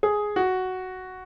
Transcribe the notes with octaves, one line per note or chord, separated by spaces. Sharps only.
G#4
F#4